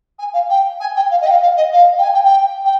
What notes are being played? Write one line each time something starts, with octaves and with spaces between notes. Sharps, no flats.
G#5
F5
G5
G#5
G5
F5
D#5
G5
F5
F5
D#5
F5
G5
G#5
G5
G5
G5